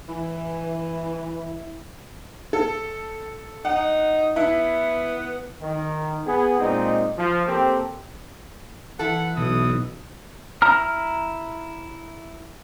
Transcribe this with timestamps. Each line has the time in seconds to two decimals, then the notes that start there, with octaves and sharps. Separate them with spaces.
0.08 E3 E4
2.53 A4
3.65 D#4 F#5
4.36 B3 E4
5.60 D#3
6.26 B3 G#4
6.59 A#2 G#3 C4 D#4
7.18 F3
7.47 A#3 C4 G4 A4 A#4
8.99 E3 E4 A4 F#5
9.37 B1 B2 E3 D#6
10.62 E4 A#5 F6